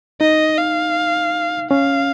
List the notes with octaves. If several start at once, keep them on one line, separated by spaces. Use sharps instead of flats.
D#4 D#5
F5
C#4 F5